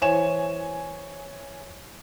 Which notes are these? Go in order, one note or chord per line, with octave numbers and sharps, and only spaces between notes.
E3 C5 C#5 G#5 E7